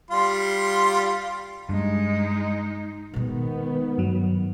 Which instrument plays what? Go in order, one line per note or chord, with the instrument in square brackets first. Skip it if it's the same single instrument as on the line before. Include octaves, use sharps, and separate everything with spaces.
[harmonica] G3 F4 C6
[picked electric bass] G2 [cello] G#3 D#4
[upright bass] B2 G#3 [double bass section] D#3 B3
[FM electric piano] G2 F#3